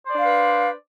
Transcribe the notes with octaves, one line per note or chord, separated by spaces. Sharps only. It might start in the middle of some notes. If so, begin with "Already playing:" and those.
D4 B4 C5 D5 F5